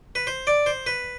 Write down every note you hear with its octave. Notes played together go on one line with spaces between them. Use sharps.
B4
C5
D5
C5
B4